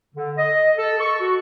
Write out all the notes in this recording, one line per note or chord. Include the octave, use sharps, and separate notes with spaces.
D3
D#5
A4
C#6
F#4